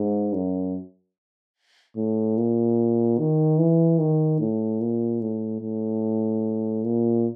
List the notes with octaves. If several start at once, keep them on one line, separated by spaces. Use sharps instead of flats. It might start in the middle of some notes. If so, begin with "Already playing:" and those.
Already playing: G#2
F#2
A2
A#2
D#3
E3
D#3
A2
A#2
A2
A2
A#2